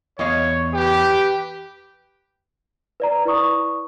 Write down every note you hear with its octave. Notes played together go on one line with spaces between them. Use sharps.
E2 C#5 D#5 F5
G4 B4
B4 D5 A#5
E4 B4 D5 C#6 D#6